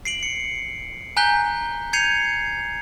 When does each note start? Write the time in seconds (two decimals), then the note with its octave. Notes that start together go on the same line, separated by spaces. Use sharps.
0.05 C7 D7 F#7
0.23 C#7
1.17 G#5 A#5 F#6 G6 B6 G7
1.93 G6 G#6 C7 C#7 D#7 F7